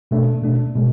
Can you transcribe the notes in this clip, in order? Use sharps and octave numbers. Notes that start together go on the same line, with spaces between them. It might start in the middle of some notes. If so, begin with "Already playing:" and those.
B2 A3 D4
B2 A3 D4
B2 G#3